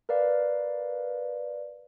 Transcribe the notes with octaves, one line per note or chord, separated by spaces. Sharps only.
A#4 B4 D5 F5